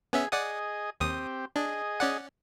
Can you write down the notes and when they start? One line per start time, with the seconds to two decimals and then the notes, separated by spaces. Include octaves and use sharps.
0.13 B3 C#4 G#4 E5
0.32 G#4 D5 D#5 F#5 D#6
1.00 D#2 C4 G4 D#6
1.56 D4 G#4 D#5
2.00 C#4 D5 F#5